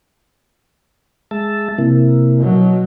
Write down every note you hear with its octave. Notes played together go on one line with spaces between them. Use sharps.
G#3 E5 A5
C3 A#3 E4
B2 F#3